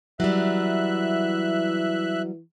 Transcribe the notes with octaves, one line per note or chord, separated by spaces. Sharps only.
E3 F#3 G3 E5 F#6